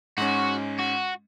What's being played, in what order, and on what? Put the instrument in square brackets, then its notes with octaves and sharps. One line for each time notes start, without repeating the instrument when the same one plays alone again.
[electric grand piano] G#2 G#3 C#4 [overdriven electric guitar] F#4
[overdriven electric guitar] F#4